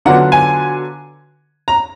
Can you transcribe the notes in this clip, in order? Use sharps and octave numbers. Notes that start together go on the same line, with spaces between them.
D3 F#3 B3 D4 F4 F#5
G#5
A#5